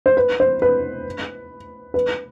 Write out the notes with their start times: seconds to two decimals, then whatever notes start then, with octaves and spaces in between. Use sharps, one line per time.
0.06 C5
0.17 B4
0.40 C5
0.62 B4
1.94 B4